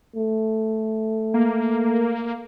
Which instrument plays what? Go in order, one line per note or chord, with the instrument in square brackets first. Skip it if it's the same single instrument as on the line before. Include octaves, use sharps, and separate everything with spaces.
[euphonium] A3
[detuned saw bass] A#3